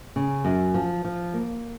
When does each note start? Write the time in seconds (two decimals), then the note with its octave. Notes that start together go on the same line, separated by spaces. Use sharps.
0.16 C#3
0.45 F#2
0.74 F3
1.05 F3
1.34 A#3